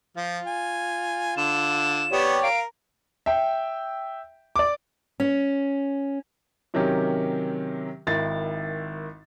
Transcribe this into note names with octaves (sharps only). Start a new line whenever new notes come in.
F3 F4
G#5
D3 E7
B3 G4 C#5 D5
A#4 F5 D7
E5 G5
D5 D6
C#4
C3 D#3 F#3 C#4 G4 A#4
G#1 D#3 E4 A6